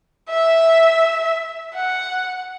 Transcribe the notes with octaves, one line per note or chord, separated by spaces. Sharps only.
E5
F#5